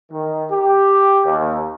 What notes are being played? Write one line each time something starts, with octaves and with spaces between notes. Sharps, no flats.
D#3
G4
D#2